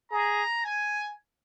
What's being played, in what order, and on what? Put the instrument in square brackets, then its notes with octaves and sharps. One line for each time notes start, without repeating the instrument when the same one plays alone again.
[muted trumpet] G#4 [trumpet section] A#5
[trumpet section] G#5